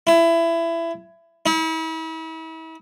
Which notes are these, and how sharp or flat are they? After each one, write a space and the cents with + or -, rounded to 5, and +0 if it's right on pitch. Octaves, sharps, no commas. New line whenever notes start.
E4 +20
E4 -40